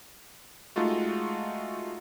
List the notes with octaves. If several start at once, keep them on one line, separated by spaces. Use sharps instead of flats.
G#3 A3 D#4 F4 F#4